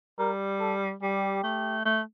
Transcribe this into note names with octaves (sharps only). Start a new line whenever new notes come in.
G3 A#4
A4
G3 G4
A3
A3